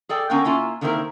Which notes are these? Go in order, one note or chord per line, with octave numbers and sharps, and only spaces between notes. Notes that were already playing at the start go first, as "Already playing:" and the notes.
G#4 A4 D5 G5
D3 B3 C#4 A#4 F5 G5
A#3 C#4 E4 F4
D3 D#3 A#3 C4 E4 A#4